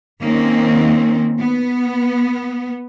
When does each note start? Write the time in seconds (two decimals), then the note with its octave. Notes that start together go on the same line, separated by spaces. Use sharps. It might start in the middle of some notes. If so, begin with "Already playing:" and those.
0.21 D#3 A#3 C4 C#4
1.39 B3